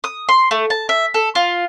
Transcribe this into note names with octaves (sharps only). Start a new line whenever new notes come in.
D#6
C6
A3
A5
E5
A4
F4